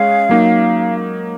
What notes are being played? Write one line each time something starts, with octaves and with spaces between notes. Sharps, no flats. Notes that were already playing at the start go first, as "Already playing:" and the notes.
Already playing: G#3 C#4 G#4 F5
F#3 A#3 D#4